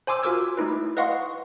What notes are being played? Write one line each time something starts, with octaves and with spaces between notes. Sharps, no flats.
C5 G#5 C6 D6 E6
F4 F#4 A#4 D6 E6 G#6
A3 D#4 E4 B4
B4 D#5 F5 F#5 C6 C#6